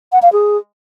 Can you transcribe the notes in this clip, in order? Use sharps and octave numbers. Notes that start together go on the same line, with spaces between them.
F#5
F5
G#4